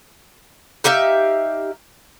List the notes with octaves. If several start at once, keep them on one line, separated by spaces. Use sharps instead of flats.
D#4 G4 E5 F5